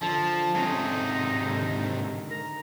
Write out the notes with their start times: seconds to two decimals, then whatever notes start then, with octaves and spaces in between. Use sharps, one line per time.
0.02 D3 F3 A5
0.55 G#2 C3 C#4 D#4 A4 G#5
1.45 D3 D#3
2.31 A#4 A#5